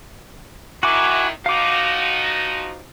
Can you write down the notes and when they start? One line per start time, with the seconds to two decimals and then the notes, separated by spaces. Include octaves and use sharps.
0.83 D#3 E4 F#4 G#5 D6
1.46 F3 D#4 F#4 F5 D6